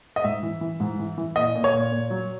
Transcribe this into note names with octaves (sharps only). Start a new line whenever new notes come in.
D#5
G#2 E5
E3
E3
G#2
E3
E3
A#2 D#5
A#2
C#5
A#2
A#2
F#3